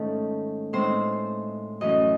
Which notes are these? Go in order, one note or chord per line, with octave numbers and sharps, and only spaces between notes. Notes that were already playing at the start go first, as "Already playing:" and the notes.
Already playing: G#2 D#3 A3 C#4 A4
A2 G#3 C4 D#4 C5
F#2 E3 A3 C#4 D#5